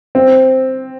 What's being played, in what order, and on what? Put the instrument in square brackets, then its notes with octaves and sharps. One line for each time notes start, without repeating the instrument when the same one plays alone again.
[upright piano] C4